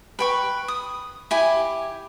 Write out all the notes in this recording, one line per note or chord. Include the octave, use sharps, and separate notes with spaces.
B4 G5 C#6
D#6
E4 G4 G#5